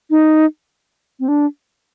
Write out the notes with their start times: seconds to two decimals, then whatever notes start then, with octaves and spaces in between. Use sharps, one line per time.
0.10 D#4
1.20 C4
1.28 D4